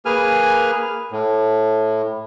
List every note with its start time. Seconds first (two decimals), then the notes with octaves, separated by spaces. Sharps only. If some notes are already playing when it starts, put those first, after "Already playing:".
0.05 A#3 G#4 B4 G#5 F6
1.12 A2